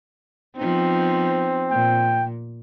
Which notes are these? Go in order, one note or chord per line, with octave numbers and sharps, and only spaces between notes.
F3 B3 C4 D#4
A#2 G5